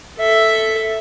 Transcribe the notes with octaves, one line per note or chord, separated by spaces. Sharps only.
A4 E5